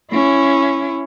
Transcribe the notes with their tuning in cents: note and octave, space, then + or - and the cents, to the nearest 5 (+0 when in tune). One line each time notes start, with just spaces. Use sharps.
C#4 +0 E4 +20